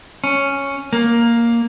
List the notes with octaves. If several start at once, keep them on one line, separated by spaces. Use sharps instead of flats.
C#4
A#3